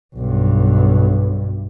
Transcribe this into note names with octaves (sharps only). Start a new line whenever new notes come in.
B1 G2